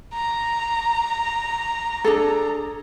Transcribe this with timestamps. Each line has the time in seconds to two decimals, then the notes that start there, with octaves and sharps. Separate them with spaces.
0.14 A#5
2.04 D4 G#4 A4